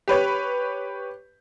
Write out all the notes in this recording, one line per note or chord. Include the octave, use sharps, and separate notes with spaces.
G4 B4 C#5